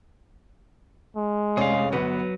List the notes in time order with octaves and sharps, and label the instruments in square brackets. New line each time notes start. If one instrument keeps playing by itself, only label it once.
[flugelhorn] G#3
[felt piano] F1 C#4 D5 [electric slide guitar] G#4 F5
[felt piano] G1 B3 [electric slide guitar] F#3 B4